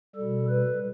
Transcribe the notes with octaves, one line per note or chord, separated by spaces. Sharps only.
G3 A4
B2
B4